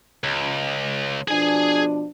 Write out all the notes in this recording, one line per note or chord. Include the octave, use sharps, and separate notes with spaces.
C#2
B2 F3 D4 G#4 G#5